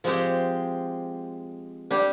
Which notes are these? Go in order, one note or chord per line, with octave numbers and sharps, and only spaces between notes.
F3 G#3 C4 G4
G3 D4 G4